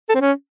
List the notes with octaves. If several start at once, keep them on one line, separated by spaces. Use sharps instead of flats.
A4
C4
C#4